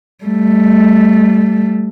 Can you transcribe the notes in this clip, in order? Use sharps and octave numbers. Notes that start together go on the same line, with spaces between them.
G3 A3